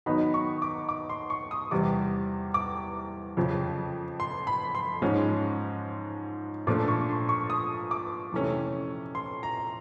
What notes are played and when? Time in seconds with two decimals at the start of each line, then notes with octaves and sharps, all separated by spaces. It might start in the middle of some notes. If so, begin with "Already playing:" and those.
0.06 D#3 F#3 B3 D#4 B5
0.34 C#6
0.62 D6
0.89 D6
1.09 C6
1.30 C#6
1.51 D#6
1.71 E2 C3 E3 G3 D6
2.54 D6
3.37 F2 C#3 F3
4.20 C6
4.47 B5
4.75 C6
5.02 G#2 F3 G#3 C#4
6.67 A#2 F3 A3 D4 D6
6.88 C#6
7.09 C6
7.29 C#6
7.50 D#6
7.91 D6
8.32 F2 C3 E3 A3 C#4
9.15 C6
9.43 A#5